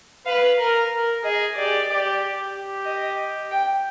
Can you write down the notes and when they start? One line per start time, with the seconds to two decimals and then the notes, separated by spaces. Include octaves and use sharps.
0.26 B4 F5
0.58 A#4
0.91 A#4
1.23 G#4 D#5
1.56 G4 D5
1.89 G4
2.53 G4
2.85 D#5
3.51 G5